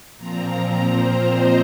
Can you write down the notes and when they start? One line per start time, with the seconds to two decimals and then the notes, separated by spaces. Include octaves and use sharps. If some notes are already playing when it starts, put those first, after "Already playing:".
0.17 A#2 F3 C4 A#5
0.94 C5
1.33 D#5